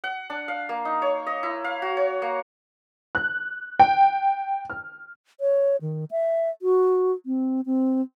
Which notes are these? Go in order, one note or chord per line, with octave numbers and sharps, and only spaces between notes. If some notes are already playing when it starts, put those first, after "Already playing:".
F#5
D4
F5
A#3
D#4
C#5
D#5
E4
F5
F#4
C#5
A#3
F#6
G5
F6
C#5
D#3
E5
F#4
C4
C4